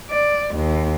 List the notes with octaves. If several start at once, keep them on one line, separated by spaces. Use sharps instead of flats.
D5
D#2